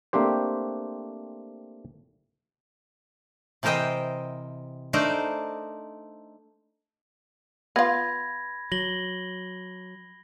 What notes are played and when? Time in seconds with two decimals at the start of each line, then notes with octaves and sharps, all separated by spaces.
0.13 A3 A#3 C4 D4 G4 C5
3.63 C3 E3 A#4 C5 D#5 G5
4.93 A3 D4 D#4 A#4 C5 D5
7.76 B3 F4 B5 G#6 A#6
8.72 F#3 A#6 F#7 G7